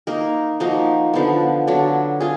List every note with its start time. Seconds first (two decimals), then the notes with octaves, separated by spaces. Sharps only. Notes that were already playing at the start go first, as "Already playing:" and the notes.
0.07 A#3 D#4 A#4
0.60 F3 A#3 D#4 F#4
1.13 D3 F3 B3
1.67 D3 F#3 D4
2.20 F4 G#4